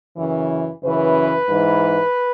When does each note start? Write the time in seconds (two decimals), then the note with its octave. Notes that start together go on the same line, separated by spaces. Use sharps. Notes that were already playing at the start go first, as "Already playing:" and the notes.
0.17 F#2 C#3 E3
0.83 F#2 C#3 E3 B4
1.48 G#2 E3